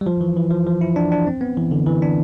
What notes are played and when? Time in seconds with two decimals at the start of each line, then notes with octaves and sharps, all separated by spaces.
0.01 G3
0.06 F3
0.21 E3
0.37 E3
0.51 F3
0.67 F3
0.81 E4
0.96 D4
1.12 D4
1.27 C4
1.41 B3
1.57 E3
1.71 D3
1.87 E3
2.02 D4